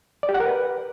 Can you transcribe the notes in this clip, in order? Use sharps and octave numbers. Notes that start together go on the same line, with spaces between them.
D5
G4
F#5
A#4
B4